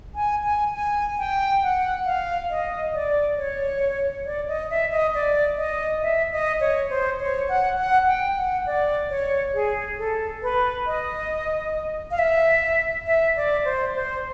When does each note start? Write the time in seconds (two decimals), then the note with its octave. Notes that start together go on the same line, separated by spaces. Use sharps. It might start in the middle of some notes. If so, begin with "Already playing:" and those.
0.15 G#5
0.44 G#5
0.74 G#5
1.18 G5
1.62 F#5
2.06 F5
2.50 D#5
2.94 D5
3.38 C#5
4.26 D5
4.48 D#5
4.70 E5
4.92 D#5
5.15 D5
5.58 D#5
6.02 E5
6.32 D#5
6.60 C#5
6.90 C5
7.20 C#5
7.49 F#5
7.78 F#5
8.07 G5
8.37 F#5
8.66 D5
9.10 C#5
9.54 G#4
9.98 A4
10.42 B4
10.87 D#5
12.11 F5
12.19 E5
13.07 E5
13.36 D5
13.65 C5
13.95 C5